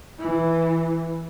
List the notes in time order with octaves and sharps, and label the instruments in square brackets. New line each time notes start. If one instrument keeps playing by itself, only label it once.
[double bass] E3